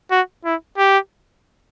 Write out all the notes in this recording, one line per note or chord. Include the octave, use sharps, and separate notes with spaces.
F#4
E4
G4